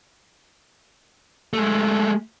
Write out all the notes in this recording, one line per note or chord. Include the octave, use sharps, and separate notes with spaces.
G#3 A3